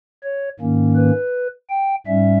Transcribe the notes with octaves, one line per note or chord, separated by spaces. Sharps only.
C#5
G#2 D#3 A#3 C#4
B4
G5
G#2 G3 C#4 E5